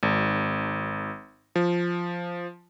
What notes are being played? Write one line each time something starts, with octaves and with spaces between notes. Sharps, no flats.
G#1
F3